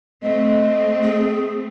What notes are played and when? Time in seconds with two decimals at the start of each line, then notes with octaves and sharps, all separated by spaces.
0.23 A3 C4 D#5
1.03 G#4